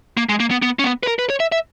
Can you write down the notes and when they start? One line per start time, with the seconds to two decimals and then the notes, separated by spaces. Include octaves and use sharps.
0.17 A#3
0.29 G#3
0.40 A#3
0.51 B3
0.62 B3
0.79 C#4
0.84 B3
1.03 B4
1.07 A#4
1.19 B4
1.30 C#5
1.40 E5
1.52 E5